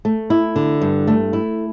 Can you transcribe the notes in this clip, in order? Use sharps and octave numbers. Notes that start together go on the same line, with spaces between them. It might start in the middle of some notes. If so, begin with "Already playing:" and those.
A3
E4
D3
G2
A3
E4